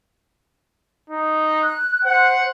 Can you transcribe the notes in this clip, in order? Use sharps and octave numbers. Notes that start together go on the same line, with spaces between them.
D#4
F#6
C5 F#5